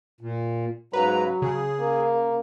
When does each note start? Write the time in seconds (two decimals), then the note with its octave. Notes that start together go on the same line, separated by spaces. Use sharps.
0.21 A#2
0.93 G#2 C#3 F#3 B4 A#5
1.42 C#3 G#4
1.80 A#3